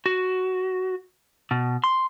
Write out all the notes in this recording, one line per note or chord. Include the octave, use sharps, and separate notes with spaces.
F#4
B2
C6